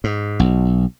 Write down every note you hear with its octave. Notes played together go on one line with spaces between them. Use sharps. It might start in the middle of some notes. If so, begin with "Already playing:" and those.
G#2
B1